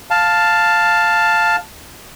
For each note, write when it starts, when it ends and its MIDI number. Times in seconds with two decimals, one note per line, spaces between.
0.11 1.56 77
0.11 1.56 81